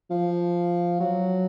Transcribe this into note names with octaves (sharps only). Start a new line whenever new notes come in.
F3
F#3